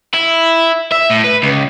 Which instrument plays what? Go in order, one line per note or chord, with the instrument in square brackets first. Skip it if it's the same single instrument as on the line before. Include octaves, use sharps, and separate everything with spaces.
[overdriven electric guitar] E4
E5
A2
B4
C#2